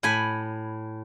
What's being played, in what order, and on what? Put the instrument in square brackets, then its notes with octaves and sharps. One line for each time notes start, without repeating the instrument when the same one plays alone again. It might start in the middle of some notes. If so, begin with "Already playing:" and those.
[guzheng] A2 G#5 B5